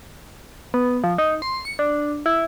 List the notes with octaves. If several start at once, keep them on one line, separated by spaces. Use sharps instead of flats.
B3
F3
D#4
C6
C#7
D4
E4